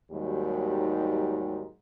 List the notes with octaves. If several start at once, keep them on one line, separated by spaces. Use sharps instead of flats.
D#2 G#2 D#3 F#3 G3